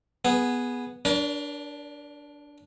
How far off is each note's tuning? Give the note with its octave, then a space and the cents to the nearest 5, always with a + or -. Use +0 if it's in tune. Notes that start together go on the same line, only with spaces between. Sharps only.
B3 -5 G#4 +0
D4 -10 A#4 +35 C#5 +45